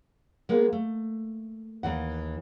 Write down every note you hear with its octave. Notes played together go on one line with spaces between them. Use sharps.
G#3 A#3 B3
A3
D#2 E3 F#5